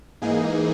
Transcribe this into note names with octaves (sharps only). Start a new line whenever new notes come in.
G#2 E3 A#3 D#4 G#4